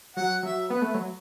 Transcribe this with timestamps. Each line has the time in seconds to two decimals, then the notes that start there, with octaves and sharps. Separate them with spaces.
0.16 F#3 F#5
0.43 F#3 E5
0.69 B3 B4
0.82 A3
0.94 F#3